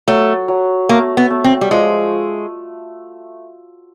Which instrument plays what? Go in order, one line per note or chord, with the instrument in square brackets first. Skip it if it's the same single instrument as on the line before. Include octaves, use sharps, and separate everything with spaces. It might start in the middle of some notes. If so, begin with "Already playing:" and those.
[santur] F#3 [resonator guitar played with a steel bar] A3
[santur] F#3
[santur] A3 [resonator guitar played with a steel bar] A#3
[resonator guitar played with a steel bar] B3
[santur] A3
[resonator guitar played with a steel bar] C4
G3
[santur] F3 [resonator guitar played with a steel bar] G#3